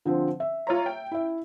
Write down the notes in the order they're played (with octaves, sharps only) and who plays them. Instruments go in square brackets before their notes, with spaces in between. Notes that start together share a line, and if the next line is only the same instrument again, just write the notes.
[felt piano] D3 F3 C4
E5
[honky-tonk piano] F4 C#5 A#5
G5
[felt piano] E4 E5